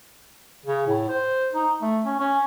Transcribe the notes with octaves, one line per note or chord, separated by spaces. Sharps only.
C#3
A2
C5
D#4
A3
C#4
C#4